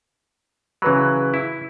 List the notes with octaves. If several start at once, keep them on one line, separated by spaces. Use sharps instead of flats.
C#3 E3 F#3 B4 B5
E4